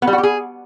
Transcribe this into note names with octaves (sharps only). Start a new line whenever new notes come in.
B3
G3
F#4
G4
G#4